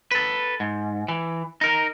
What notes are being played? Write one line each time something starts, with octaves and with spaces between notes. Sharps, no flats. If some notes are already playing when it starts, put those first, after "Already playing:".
A4 B4
G#2
E3
D#4 A#4